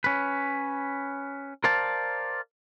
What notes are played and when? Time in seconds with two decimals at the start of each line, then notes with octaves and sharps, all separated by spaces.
0.04 C#4 B4
1.64 A#4 C5 D5 F5 A5